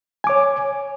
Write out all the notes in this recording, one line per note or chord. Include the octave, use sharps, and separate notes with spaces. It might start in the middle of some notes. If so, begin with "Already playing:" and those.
C#5 G#5 D6